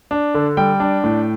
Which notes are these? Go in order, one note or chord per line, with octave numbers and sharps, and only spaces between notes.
D4
D3
G3 G5
D4
A2